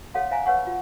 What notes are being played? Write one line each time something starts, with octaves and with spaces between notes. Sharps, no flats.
A4 C#5 F5 F#5 C6
C5 E5 F5 G#5 A#5
B4 C#5 F#5 C#6
F4